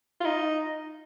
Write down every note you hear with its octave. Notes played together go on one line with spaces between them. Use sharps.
F4
D#4